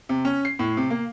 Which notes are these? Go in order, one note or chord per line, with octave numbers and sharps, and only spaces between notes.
C3
C#4
C7
A2
C3
A#3